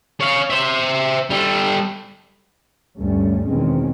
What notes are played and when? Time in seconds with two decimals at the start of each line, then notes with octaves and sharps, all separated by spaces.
0.21 C#5 F5
0.50 C5 E5
1.30 G3 A4
2.96 D2 G2 G3 A3 C#4
3.46 E2 B2 D#3 G#3 C4 C#4